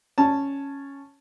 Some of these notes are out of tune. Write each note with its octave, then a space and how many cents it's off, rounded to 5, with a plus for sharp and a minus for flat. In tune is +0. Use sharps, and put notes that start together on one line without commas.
C#4 +0 A5 +0